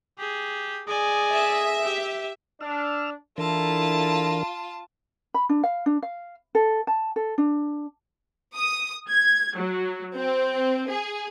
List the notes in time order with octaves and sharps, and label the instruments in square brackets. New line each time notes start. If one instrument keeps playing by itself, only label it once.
[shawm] G4 [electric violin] G#4
[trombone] G#4 [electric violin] D5 G#5 [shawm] D#5
[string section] E5
[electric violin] G4
[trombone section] D4 [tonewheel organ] E6 F6
[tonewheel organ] E3 D4 A#4 [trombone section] E4 A4 [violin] F4 A5
[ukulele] B5
D4
F5
D4
F5
A4
A5
A4
D4
[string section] D#6
G#6
F#3
C4
G#4